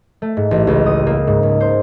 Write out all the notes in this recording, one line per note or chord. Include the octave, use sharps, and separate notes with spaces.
A3
G#2
A1
C#2
D#6
A#3
G#2
C#2
C5